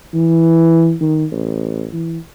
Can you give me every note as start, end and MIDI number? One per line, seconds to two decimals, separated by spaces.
0.14 0.94 52
1.01 1.25 51
1.32 1.87 33
1.93 2.18 52